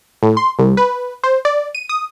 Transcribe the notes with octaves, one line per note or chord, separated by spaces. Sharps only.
A2
C6
C2
B4
C5
D5
D#7
D#6